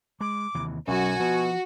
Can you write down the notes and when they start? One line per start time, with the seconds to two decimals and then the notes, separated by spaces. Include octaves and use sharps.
0.21 G#3 D6
0.55 D#2 C3 E3
0.88 B1 F#2 F#3 F#4 G#5
1.20 B2 F3